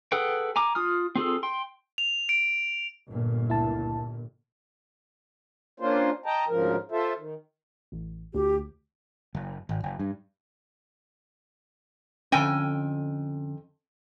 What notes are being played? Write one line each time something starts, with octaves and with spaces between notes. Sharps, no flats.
G#4 A4 B4 F#5 G5
G#5 A#5 D6
F4 D#6 F6
C4 F4 G#4 A4
G5 C6
F7
D7
G1 A#2
C#2 E4 A5
A#3 C#4 D4 F4 C5
D#5 G5 A5 A#5
D2 G#2 C#3 F3 A#4
F4 A4 C5 E5
D#3
A1
D2 G4
F#1
G#1
F#1
G2
F2 D3 C#4 G5 G#5